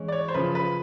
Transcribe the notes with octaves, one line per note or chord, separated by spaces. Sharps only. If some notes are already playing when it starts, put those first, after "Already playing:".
Already playing: E3 G#3 C#4
D5
C#5
C5
F#2 C#3 F3 B4
B4